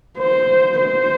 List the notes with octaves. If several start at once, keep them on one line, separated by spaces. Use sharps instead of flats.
C5
C5